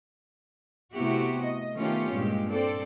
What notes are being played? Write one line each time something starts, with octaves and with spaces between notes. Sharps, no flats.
C3 A3 B3 E4 F#4 G4
D#5
D#3 A3 B3 C#4 F4 G4
G2 A#2 G#3 G4
C4 A4 D5